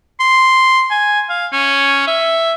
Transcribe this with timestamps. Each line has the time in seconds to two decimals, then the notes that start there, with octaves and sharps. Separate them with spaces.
0.20 C6
0.91 G#5
1.30 F5
1.52 C#4
2.07 E5